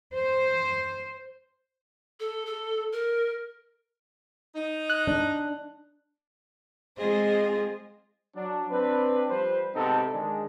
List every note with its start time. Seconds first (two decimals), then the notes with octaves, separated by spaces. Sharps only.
0.14 C5
2.20 A4
2.46 A4
2.93 A#4
4.55 D#4
4.90 F#6
5.07 D4
6.96 G#3 C4 F4 G#4 C5 D#5
8.35 F#3 D4
8.71 C4 D4 B4
9.29 F3 G3 B4 C5
9.75 G#2 C3 B3 C4 D#4 A4
10.13 D#3 G#3 D4